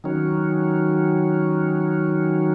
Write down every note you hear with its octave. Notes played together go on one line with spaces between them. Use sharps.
D#3 F#3 C#4